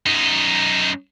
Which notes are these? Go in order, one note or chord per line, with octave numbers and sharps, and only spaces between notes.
F#2 D#4